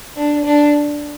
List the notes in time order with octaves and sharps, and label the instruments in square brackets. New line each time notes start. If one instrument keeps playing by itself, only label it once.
[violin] D4
D4